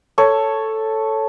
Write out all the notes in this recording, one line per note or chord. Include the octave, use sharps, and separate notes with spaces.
A4 C#5